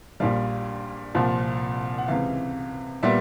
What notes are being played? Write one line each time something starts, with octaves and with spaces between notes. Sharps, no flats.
A#1 A#2 G3 F5
C2 A#2 F3
F#5
C#2 C3 E3 F5
A#2 G3 B3 E5